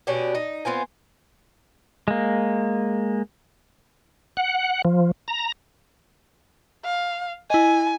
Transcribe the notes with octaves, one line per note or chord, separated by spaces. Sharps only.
B2 C#4 D4 G4
D#4
B3 C4 F4 G#5
G#3 A#3
F#5
F3
A#5
F5
E4 D#5 G#5